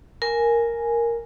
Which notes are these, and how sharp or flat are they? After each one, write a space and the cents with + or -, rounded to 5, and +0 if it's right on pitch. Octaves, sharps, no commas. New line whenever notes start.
A#4 +0 G#5 +0